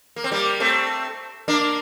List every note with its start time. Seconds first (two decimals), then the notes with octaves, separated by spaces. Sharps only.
0.16 A#3
0.24 C4
0.32 G3 A#3
0.60 A3 C4
1.48 A#3 D4